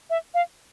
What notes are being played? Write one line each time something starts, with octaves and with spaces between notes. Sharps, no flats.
E5
F5